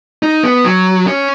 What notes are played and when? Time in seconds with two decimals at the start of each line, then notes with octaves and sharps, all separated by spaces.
0.23 D#4
0.43 B3
0.65 F#3
1.06 C#4